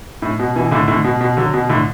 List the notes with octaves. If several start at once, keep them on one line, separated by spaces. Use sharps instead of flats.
A2
B2
B2 E3
A2 D3
A2 D3
B2
B2
D3 F#3
B2
A2 D3